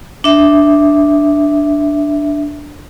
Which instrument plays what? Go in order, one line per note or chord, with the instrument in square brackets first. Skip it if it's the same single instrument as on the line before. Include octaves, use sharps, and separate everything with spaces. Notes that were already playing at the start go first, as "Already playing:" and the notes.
[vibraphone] D4 E5